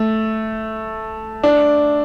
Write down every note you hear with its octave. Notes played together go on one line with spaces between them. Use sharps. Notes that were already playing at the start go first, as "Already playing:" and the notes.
Already playing: A3
D4